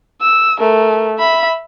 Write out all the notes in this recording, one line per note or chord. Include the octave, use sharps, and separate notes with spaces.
E6
A3 A#4
E5 B5